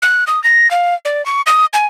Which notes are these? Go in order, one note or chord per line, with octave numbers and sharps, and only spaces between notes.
F#6
D#6
A#6
F5
D5
C#6
D#6
G#5